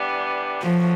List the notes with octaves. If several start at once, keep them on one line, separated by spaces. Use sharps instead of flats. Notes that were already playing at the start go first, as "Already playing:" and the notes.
Already playing: E3 G3 B3 D4 G4
E3 F3 A3 C#4 F#4